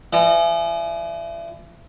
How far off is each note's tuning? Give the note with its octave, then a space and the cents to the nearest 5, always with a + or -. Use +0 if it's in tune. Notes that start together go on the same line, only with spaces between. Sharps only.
E3 +35 D#5 -35